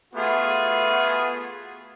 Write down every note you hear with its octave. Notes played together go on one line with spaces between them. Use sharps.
A3 B3 F4 F#4 G#4